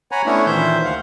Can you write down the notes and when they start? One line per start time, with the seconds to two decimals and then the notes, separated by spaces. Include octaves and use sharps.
0.12 C#5 F#5 G#5 A#5 B5
0.26 A3 B3 C#4 D4 E4 C#5
0.46 A#2 D#3 E3 C5 E5 G6
0.85 D2 F5 F#5